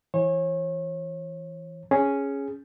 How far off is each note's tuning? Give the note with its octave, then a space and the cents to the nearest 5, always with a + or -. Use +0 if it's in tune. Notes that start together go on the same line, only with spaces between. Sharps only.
E3 +0 C#5 -35
C#4 +0 G#4 +0